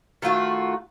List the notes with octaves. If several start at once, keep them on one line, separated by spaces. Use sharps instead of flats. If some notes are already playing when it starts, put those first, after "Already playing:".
D#3 A3 F4 F#4